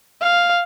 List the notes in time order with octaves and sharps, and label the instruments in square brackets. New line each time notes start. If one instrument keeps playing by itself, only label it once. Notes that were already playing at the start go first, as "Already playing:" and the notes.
[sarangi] F5